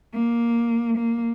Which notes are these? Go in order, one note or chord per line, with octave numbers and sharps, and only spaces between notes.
A#3
A#3